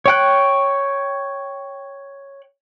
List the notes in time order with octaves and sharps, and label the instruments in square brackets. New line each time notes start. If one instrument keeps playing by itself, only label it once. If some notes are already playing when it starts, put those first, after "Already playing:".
[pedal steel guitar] C#5 G5 F#6